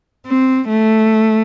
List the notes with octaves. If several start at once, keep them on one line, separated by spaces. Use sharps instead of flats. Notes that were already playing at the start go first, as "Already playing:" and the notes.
C4
A3